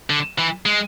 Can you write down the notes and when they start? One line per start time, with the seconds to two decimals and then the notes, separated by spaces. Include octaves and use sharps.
0.10 D3
0.38 E3
0.66 G#3